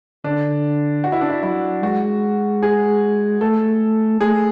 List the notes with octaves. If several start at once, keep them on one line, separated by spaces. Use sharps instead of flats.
D3 D4
F#4
E4
D4
E4
F#3 E4
G#3 F#4
G#4
A3 A4
A3 G#4